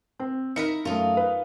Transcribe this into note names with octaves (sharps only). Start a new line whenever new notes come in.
C4
D#4 E4 A#4 B4 C#7
F#2 A3 D#4 F4
B4